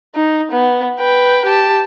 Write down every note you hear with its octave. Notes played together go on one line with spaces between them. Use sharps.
D#4
B3
B4 G5
G4 A5